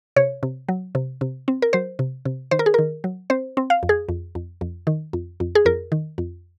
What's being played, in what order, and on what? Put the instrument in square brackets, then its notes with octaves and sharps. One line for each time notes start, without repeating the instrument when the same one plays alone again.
[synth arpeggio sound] C3 C#5
C3
F#3
C3
C3
C4
A#4
F#3 C5
C3
C3
D#3 C5
A#4
G#4
D#3 A#4
F#3
C4 C5
C4
F5
F2
G#4
F2
F2
F2
D#3
F2
F2
G#4
F2 A#4
D#3
F2